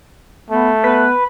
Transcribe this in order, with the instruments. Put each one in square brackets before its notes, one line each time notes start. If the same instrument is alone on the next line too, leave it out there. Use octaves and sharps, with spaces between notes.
[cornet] A3 [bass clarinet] B3
[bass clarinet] B3 [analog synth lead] B4